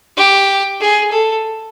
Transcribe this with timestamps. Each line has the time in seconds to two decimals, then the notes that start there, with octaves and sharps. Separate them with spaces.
0.17 G4
0.80 G#4
1.11 A4